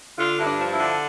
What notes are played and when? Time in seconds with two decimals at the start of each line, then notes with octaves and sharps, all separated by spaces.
0.17 D3 F4
0.37 G2 E4
0.45 D4
0.59 F3
0.72 E4
0.79 D3